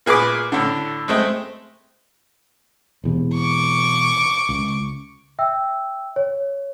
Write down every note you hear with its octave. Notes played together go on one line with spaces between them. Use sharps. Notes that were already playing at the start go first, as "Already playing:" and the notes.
A#2 G#4 B4 B5 D6
A2 D3
G#3 A3 C4
E1 E2 C3
C#6 D6
C#2
E5 G5 E6
C#5